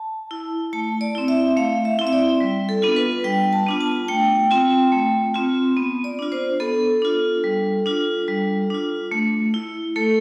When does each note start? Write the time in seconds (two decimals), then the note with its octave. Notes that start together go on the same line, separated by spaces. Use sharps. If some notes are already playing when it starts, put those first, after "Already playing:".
Already playing: A5
0.31 E4
0.73 A3 A5
1.01 D5
1.15 C4 E4
1.28 E5
1.57 A3 F5
1.85 E5
1.99 C4 E4
2.07 E5
2.13 D5
2.40 G3
2.69 A4
2.82 B3 D4 F4
2.96 B4
3.24 G3 G5
3.53 A5
3.66 B3 D4 F4
3.81 A5
4.08 A3 G5
4.51 C4 F4
4.92 A3
5.34 C4 F4
5.77 B3
6.04 D5
6.19 D4 F4
6.32 C5
6.60 B3 A4
7.02 D4 F4
7.44 G3
7.86 D4 F4
8.28 G3
8.70 D4 F4
9.12 A3
9.54 E4
9.96 A3 A4